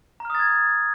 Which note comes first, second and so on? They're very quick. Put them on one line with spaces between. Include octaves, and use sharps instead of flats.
A#5 F6 D#6 A6 G#6